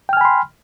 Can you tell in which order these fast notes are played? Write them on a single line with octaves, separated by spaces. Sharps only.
G5 F6 G#5 B5 C6